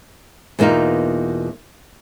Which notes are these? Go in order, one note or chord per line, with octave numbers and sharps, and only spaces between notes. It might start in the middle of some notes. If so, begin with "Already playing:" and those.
E2 B2 A#3 D#4 F4